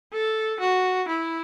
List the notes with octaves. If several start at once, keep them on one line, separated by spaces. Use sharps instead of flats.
A4
F#4
E4